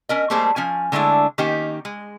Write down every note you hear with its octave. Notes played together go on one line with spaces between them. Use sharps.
C#4 A#4 D#5
G3 A3 A#3 G#4 C5 A5
F3 C#4 G#5
D3 G#3 A3 D4 E4
D#3 A#3 C#4 D#4 G4
G#3